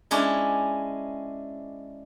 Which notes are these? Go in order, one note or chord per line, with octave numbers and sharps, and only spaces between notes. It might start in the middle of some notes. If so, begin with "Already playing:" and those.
G#3 C#4 D4 E4